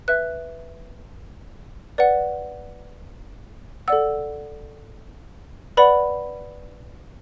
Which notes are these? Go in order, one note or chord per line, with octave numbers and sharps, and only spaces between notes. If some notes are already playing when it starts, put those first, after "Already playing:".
B4 E5 F#6
B4 D5 F#5
A4 D5 F#5 E6
B4 D5 F#5 B5